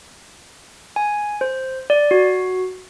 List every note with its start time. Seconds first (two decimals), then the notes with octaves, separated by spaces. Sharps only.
0.96 G#5
1.41 C5
1.90 D5
2.11 F#4